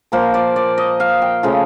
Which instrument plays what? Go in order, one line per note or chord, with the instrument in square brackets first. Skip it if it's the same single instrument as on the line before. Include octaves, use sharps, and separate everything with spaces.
[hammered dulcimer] A#2 F3 A#3 C5
D5
D5
D#5
F5
G5
C#3 F3 A3